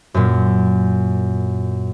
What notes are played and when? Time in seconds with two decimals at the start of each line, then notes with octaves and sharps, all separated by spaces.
0.14 F#2 A#2